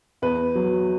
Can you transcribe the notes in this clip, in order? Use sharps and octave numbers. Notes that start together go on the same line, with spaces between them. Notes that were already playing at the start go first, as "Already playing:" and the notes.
E2 B4
F#3